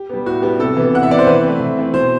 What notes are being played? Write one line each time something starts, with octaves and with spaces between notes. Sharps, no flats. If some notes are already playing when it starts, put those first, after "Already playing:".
Already playing: G4
G3 B3
A2 F#4
G3 B3 G4
C3 A4
E3 B3
C3 F#5
E5
E3 B3 D5
C5
E3 B4
A3 C4
E3
A3 C4
B2 C5